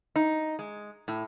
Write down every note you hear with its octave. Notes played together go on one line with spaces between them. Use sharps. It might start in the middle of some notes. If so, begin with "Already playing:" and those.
D#4
G#3
A2